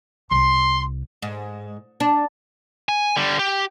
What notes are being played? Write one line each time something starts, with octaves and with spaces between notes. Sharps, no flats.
C2 C6
G#2
D4
G#5
D3 G3
G4